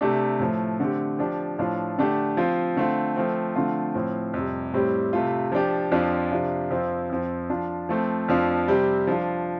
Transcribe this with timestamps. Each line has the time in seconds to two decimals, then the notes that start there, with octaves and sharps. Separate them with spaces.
0.01 C3 A3 D4 G4
0.40 A2 F3 A3
0.80 D3 A3 C4 G4
1.19 F3 D4 G4
1.59 A2 F3 D4 F4
1.98 D3 A3 D4 G4
2.37 F3 C4 F4
2.76 D3 A3 C4 F4
3.16 F3 A3 C4
3.56 D3 F3 A3 C4 F4
3.94 A2 F3 C4
4.34 F2 C3 G3
4.74 A2 G3 C4 G4
5.13 C3 A3 F4
5.52 F3 D4 G4
5.92 F2 F3 D4 F4
6.32 C3 F3 D4 F4
6.71 F2 F3 C4 F4
7.10 F2 F3 C4
7.50 F3 D4 F4
7.89 F3 A3 C4
8.28 F2 F3 D4 F4
8.68 C3 G3 C4
9.07 F3 D4 F4